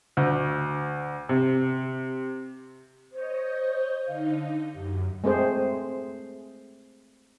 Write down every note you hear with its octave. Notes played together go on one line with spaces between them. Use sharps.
D2
C3
C5 C#5 D#5
D3 D#4 F5
F#2 G4
G#3 A3 C4 G#4 C5